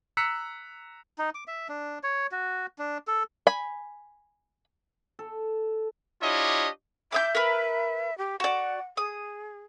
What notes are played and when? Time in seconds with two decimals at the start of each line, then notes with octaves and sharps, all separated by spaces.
0.17 A#5 E6 F#6 B6 C#7
1.18 D#4
1.35 D6
1.48 E5
1.69 D4
2.03 C#5
2.32 F#4
2.78 D4
3.07 A4
3.47 G#5 B5
5.19 A4
6.22 D4 E4 F4 G4 C#5 D#5
7.12 E5 D6 D#6 G6
7.35 A#4 B4
8.18 G4
8.40 F#4 D5 F#5
8.97 G#4 D#6